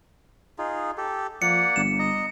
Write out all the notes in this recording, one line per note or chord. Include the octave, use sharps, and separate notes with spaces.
D#4 F4 G#4
G4 A4
F3 A#3 D5 F#5 C#7
G1 E7
D#5 A#5